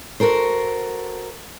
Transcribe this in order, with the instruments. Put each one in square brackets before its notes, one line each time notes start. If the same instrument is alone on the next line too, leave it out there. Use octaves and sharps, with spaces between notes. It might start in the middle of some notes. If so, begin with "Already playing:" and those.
[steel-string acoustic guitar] F#4 A4 A#4 C5